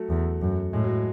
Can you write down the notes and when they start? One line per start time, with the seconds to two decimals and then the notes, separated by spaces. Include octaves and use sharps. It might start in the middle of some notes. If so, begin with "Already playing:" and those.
Already playing: F#3 A3
0.10 E2
0.42 F#2
0.73 A2 G#3
0.84 F#3